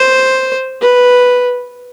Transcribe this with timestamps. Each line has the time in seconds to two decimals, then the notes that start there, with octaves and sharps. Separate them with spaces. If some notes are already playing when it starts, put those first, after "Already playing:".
Already playing: C5
0.81 B4